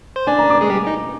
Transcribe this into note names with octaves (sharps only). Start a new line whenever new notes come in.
C5
D4 D5 G#5
A#5
D6
G#3 G#4
G3 G4
D#4